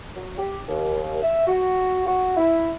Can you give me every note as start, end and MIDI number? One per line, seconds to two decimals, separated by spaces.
0.16 0.33 54
0.37 0.59 67
0.66 1.17 39
1.21 1.45 76
1.47 2.03 66
2.06 2.34 66
2.37 2.71 64